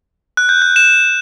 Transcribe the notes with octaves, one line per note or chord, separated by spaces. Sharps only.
F#6
G6
F#6
E7